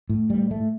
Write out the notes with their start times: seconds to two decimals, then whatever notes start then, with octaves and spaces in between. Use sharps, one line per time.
0.10 A2
0.30 G3
0.51 A3